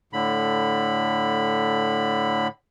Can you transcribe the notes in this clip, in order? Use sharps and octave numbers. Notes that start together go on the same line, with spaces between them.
A2 D3 B5